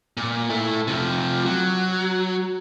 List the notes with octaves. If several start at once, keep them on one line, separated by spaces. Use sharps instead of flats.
A#2
A3 E4
C3 F3
F#3